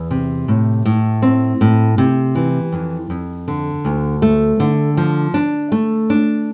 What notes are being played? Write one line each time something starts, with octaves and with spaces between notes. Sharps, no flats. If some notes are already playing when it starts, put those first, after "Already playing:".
Already playing: E2
C3
A2
A2
C4
A2
C3
E3
F2
F2
D3
D2
A3
D3
F3
D4
A3
D4